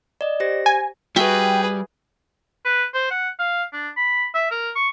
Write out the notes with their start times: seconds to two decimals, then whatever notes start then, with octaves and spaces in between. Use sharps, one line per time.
0.21 D5 D#5
0.40 G4 C5 A#6
0.66 G#5
1.16 G3 F#4 G#4 B4 E5 G5
2.65 B4
2.94 C5
3.10 F#5
3.39 F5
3.73 D4
3.97 B5
4.34 E5
4.51 A#4
4.75 C#6